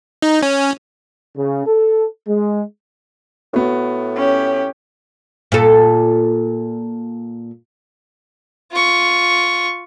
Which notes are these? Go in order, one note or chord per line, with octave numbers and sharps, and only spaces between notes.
D#4
C#4
C#3
A4
G#3
A2 B3 F#4
C#4 G4
A#2 A4
F4 C#6